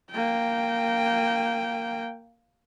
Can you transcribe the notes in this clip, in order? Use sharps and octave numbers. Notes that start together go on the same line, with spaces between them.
A#3 G5